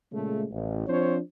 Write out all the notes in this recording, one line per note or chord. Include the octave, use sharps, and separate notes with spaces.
A#2 C#3 G#3 A3
A1
F3 C4 D4 F4 C5 C#5